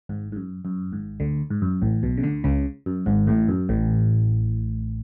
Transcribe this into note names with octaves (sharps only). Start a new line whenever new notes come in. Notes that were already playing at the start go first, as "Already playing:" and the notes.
G#1 G#2
G#2
F#2
F#2
G#1 G#2
D2 D3
G#2
F#2
A1 A2
B1 B2
C#3
D2 D3
C#2 C#3
F#2
G#1 G#2
A1 A2
F#2
A1 A2